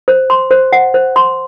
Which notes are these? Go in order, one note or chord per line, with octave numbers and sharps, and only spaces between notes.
C5
C6
C5
F#5
C5
C6